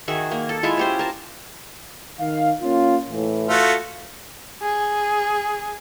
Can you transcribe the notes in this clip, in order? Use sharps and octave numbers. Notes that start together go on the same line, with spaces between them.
D#3 F#4 G#4 E5
A#3
A4
G#3 E4 F4 E5
C#4 G4 C5
A#4 A5
D#3 F5
A#3 C#4 F4
A2 E3
A3 F4 F#4
G#4